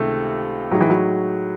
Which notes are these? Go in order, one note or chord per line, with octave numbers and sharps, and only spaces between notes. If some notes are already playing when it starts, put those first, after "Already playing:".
Already playing: C#2 C3 D#3 A3
A2 F#3 G#3 D#4
E3
F#3